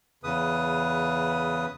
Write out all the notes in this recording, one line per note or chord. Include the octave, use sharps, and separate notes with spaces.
E2 C#3 B4 D#6